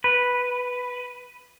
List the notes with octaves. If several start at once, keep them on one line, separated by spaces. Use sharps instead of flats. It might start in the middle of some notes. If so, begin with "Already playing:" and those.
B4